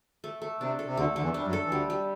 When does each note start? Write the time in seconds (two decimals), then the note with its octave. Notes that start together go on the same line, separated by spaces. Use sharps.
0.24 A3
0.42 A3
0.61 C3 D4
0.79 A4
0.86 C3
0.97 D2 D3 A3
1.16 D3 A3
1.22 E2 E3
1.34 G3 D4
1.47 F#2 F#3
1.53 A4
1.66 E3
1.71 D2 D3 G3
1.90 G3